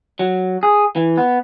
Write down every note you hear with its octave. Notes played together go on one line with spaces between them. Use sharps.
F#3
G#4
E3
B3